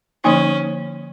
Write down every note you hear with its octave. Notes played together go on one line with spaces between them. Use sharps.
D3 F3 A#3 C#4 D#4